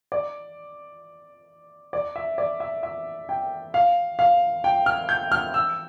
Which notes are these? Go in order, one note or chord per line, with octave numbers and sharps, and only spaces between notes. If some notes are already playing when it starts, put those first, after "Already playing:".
D5
D5
E5
D5
E5
E5
G5
F5
F5
G5
F6
G6
F6
E6